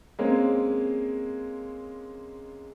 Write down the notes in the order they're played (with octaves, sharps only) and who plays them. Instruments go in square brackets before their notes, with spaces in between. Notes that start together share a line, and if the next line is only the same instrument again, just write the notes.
[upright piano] G#3 A#3 C4 C#4